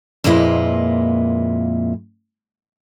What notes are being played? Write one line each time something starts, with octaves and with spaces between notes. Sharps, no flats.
F2 A#2 G#3 A#3 E4 B4